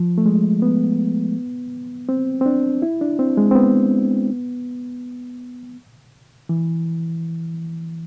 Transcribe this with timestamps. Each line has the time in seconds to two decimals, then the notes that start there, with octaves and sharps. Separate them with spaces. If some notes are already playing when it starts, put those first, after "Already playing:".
Already playing: F3
0.18 A3
0.26 G#3
0.62 B3
2.09 C4
2.41 C4
2.46 D4
2.82 E4
3.01 D4
3.19 C4
3.37 G#3
3.51 C4
3.55 B3
6.49 E3